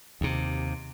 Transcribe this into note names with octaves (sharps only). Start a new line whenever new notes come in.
D#2 C3